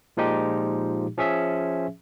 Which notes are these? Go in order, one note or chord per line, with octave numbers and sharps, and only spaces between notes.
A#2 F3 G#3 D#4 G4
F3 C#4 G#4 E5